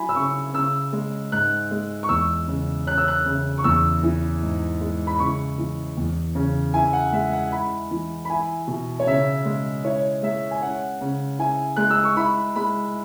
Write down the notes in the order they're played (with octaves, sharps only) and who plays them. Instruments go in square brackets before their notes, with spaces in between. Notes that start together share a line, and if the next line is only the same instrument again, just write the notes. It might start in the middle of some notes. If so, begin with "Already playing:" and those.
Already playing: [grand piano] F#3 E4 G#5 B5
E6
C#3 C#6
C#3 E6
G#3
G#2 F#6
G#3
C#6
E2 E6
C#3
C#4 F#6
E6
F#6
C#3
C#6
E2 E6
E3
G#2
G#3
B5
C#3 C#6
E3
E2
C#3
E4 G#5
F#5
G#3 E5
F#5
E4 B5
E3
B5
E4 G#5
B2
C#5
C#3 E5
G#3
E4 C#5
G#3 E5
G#5
C#4 F#5
C#3
E4 G#5
G#3 F#6
E6
C#6
E4 B5
G#3 B5